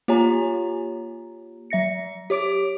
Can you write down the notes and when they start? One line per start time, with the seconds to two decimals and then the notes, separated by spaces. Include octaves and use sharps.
0.08 A#3 F4 G4 C#5 G#5 A#5
1.70 F#3 E5 A#6 C#7
2.30 G4 C#5 D6 D7